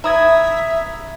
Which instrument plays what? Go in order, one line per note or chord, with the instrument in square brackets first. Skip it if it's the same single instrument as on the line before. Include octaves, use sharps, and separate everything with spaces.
[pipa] E4 [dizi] E5 [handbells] A#5 D#6 G#6